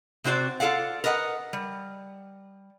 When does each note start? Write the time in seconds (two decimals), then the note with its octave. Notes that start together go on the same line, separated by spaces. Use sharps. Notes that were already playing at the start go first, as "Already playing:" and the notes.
0.24 C3 C4 F#4 C5 D5
0.60 F4 A4 D5 F5 F#5
1.04 A#4 B4 D#5 F5 F#5
1.53 G3